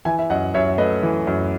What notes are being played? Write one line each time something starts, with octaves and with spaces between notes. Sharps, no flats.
E3 E5 G#5
E5
F#2 D#5 F#5
F#2 C#5 E5
A3 B4 D#5
E3
F#2